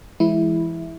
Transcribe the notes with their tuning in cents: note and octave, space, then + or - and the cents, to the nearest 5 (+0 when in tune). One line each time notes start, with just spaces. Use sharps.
E3 +25 G#3 +0 E4 -5